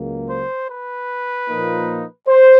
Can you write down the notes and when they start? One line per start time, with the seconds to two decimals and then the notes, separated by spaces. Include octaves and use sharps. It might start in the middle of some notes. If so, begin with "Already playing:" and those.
Already playing: C#2 C#3 F#3 A#3
0.29 C5
0.70 B4
1.48 A#2 F3 A#3 D#4
2.28 C5